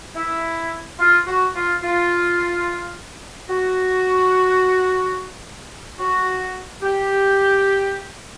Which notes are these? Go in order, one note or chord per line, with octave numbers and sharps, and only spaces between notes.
E4
F4
F#4
F4
F4
F#4
F#4
G4